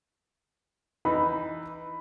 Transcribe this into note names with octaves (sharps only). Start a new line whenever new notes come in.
E3 D#4 B5